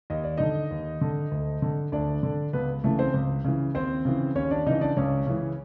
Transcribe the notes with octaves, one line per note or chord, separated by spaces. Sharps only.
D#2 D#5
D5
D3 D#4 D#5
D#2
D3
D2
D3
D2 D4 D5
D3
C#2 B3 B4
C#3 E3 A3 A4
C4 C5
C#2
C#3 E3
D#2 C4 C5
C#3 E3
D#2 C#4 C#5
D4 D5
C#3 E3 D#4 D#5
D4 D5
C#2 C#4 C#5
C#3 E3